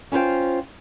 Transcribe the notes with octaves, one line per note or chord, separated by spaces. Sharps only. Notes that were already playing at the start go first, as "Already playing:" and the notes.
C#4 E4 F4 C5 G5